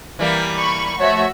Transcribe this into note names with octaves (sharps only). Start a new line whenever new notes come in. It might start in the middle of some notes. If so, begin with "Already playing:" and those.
E3 G3 A#3
B5 C#6
F3 A3 F#4 C#5 E5